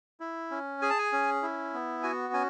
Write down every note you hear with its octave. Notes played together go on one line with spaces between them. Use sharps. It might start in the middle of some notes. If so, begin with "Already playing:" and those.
E4
C#4
G#4 G#5
A5
G#5
C#4
E4
B3
F#4 G#5
C#4 G#5